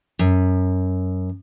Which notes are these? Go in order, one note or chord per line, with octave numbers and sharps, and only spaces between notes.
F#2